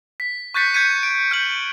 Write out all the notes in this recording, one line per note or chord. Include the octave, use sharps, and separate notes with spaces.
B6
C#6 F#6 G6 A6 B6 C#7
G6 G#6 B6 C#7 D#7
D7
F6 G6 F#7